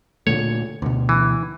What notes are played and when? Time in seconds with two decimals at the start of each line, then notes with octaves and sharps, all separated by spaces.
0.27 A#2 D3 A3 C#5
0.82 D2 B2
1.09 E3